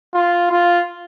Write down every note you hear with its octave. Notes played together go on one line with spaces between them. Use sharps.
F4
F4